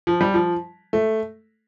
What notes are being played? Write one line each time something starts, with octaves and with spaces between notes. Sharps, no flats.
F3
G3
F3
A3